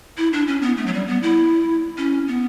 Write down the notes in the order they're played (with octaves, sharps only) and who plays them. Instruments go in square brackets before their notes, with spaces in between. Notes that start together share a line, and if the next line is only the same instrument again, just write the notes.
[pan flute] E4
D4
C#4
B3
A3
F#3
G3
B3
E4
C#4
B3